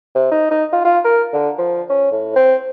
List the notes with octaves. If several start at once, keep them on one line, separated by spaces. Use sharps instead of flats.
C3
D#4
D#4
F4
F4
A#4
D3
F3
C#4
A2
C4